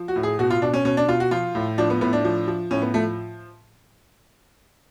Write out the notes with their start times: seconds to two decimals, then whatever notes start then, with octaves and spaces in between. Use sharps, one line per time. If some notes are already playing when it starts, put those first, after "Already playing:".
Already playing: F3
0.08 F#4
0.16 A2
0.23 G#4
0.39 B2 F#4
0.50 F4
0.62 B2 D4
0.74 C#4
0.85 B2 C#4
0.97 D4
1.09 B2 F4
1.20 F#4
1.31 F3 F4
1.55 A2
1.78 F3 D4
1.90 B3
2.01 A2 B3
2.13 D4
2.24 F3
2.47 F3
2.71 A2 C#4
2.82 B3
2.94 F3 A3